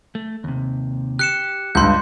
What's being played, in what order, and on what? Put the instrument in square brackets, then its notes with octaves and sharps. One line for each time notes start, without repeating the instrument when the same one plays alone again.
[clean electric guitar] A3
D#2 C3
[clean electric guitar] G4 [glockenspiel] F#6 C#7 E7
[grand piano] C#2 G2 [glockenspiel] C6 G6